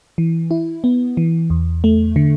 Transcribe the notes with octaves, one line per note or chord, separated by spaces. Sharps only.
E3
E4
B3
E3
E2
A3
D3